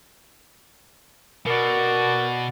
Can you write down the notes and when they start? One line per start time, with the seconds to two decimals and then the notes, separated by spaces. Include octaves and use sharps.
1.46 B2 F#4 A#4 D5